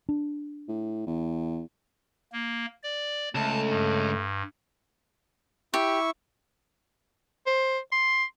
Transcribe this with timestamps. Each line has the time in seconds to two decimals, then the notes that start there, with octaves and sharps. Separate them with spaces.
0.09 D4
0.68 A2
1.07 E2
2.33 A#3
2.83 D5
3.35 C#2 A3 A5
3.70 G2
5.74 E4 G4 C#6
7.47 C5
7.92 C6